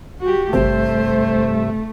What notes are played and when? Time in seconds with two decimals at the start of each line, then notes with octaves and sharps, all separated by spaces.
0.21 F#4 G4
0.53 G#1 G2 C3 A3 C5 E5